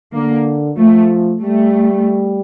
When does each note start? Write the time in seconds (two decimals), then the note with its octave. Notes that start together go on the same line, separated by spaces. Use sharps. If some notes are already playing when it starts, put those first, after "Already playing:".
0.13 D3 A#3
0.77 F3 A3
1.42 G3 A3